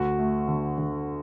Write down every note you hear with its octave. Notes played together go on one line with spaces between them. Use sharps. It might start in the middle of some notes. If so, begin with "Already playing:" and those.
Already playing: D2 F#4
A3
D3
D3